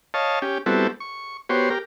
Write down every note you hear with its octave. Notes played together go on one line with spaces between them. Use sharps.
C#5 D#5 F5 A5
C#4 G4
G3 B3 C4 E4 F#4 A4
C#6
B3 F#4 G4 C5 C#5
G4 A#4